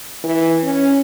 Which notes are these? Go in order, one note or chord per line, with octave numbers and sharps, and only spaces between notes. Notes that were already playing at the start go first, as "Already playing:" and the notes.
E3
C#4